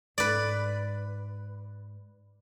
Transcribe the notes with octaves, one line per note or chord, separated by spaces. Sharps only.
G#2 B4 D5